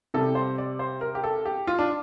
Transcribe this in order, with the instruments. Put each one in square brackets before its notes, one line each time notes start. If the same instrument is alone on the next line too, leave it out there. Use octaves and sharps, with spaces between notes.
[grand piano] C3 G3 A4
C5
D5
C5
A#4
G4
A4
G4
F4
D4